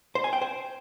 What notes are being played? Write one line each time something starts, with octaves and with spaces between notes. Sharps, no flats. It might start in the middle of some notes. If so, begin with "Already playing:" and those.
C5
G#5
G5
C5